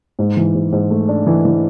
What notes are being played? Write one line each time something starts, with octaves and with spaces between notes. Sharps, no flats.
G#2
E3
G#2
G#2
A3
D4
E3
E3